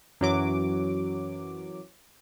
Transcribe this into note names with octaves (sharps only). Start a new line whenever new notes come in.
F#2 E3 F#3 D6